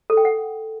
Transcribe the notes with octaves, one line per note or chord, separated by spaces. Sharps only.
A4
G5
F#5